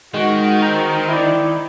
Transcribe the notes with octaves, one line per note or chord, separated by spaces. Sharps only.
D#3 G#3 F#4
C4 D#4 A#5
E4 D5